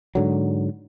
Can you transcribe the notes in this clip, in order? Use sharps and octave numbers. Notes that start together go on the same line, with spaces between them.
G#2 D3 F#3